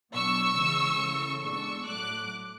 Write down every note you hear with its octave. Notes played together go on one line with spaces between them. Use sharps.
B2 F#3 B3 D4 C#6 E6
C#3 E3 G#3 C#4
C#3 E3 A3
B2 G#3 D4 C#6 E6
A2 F#3 A3 D6 F#6